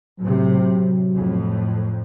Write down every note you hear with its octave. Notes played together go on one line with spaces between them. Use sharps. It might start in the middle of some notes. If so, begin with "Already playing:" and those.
A2 C3 F#3
F2 A2